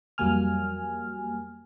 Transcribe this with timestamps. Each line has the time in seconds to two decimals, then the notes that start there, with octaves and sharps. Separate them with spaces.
0.18 F2 F#3 G3 A#3 G#5 F6